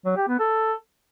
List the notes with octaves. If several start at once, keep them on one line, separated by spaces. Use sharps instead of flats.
F#3
G4
B3
A4